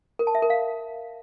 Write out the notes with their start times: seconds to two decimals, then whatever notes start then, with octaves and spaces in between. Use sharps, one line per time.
0.19 A#4
0.27 A5
0.35 E5
0.42 A#4
0.50 F5